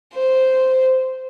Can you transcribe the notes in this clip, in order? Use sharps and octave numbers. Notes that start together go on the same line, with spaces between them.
C5